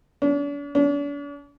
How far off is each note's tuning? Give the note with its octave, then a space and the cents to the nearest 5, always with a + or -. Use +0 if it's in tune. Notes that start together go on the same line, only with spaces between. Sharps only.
D4 -45
D4 -45